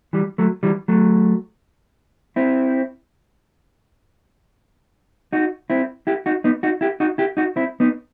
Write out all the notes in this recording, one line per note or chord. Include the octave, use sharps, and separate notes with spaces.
E3 G3
F#3 A3
E3 G3
F#3 A3
C4 E4
D#4 F#4
C4 E4
E4 G4
D#4 F#4
B3 D#4
D#4 F#4
E4 G4
D#4 F#4
E4 G4
D#4 F#4
C4 E4
B3 D#4